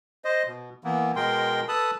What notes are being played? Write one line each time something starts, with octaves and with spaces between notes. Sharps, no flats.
C5 D#5
B2
E3 A#3 B3
B2 G#3 A#4 G5 C6
A4 B4 A5 B5 D#6